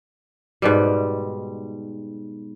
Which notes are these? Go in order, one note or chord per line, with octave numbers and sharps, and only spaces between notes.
G#2 B2 G3